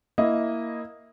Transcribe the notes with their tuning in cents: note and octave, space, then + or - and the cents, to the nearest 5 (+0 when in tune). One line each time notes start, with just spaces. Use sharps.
A#3 +0 E4 +0 D#5 +0